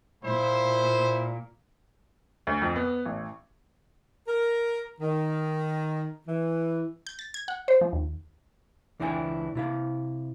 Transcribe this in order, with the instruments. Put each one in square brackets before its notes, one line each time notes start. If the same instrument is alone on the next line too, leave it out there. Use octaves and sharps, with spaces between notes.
[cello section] A#2 [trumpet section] E4 C5
[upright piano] D2
F2
B3
A1
[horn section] A#4
D#3
E3
[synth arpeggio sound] G6
A6
G#6
F#5
C5
F3
D#2
[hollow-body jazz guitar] C#2 E3 D4 E4 G5 G#5
C3 E4 F5